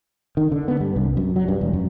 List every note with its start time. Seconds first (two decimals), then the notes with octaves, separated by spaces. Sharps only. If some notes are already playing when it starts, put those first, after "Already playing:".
0.37 D#3
0.52 D3
0.68 B3
0.80 G2
0.96 C2
1.17 F#2
1.36 F#3
1.48 G2
1.61 E1
1.73 F#2